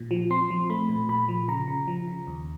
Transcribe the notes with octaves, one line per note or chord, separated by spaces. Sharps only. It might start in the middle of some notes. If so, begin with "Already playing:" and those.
Already playing: A#2
F3
C4 C6
F3
A3 B5
A#2
A#2 B5
F3
C#3 A#5
C#3
F3
C#3
D#2